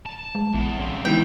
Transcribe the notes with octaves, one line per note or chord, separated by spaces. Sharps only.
A5
G#3
A#1 E2
C#3 C4
D#3 E3 G#3 B3 G5